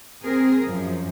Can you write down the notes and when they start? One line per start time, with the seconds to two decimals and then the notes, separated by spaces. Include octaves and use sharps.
0.22 C4 G#4 A#4
0.64 F#2 F3